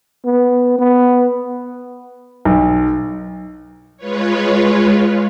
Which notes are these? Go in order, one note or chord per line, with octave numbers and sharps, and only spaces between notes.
B3
B3
B1
G#3 F4 B4 C#5